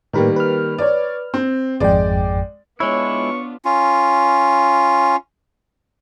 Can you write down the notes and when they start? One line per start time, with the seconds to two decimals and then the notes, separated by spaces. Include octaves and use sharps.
0.13 A2 D#3 G3 A#3 A#4 B4
0.36 B4 F6
0.78 C#5 D5
1.34 C4
1.80 G#1 F2 G#3 D5 G5
2.80 G#3 B3 D4 E4 F4 C#5 C#6
3.65 C#4 F4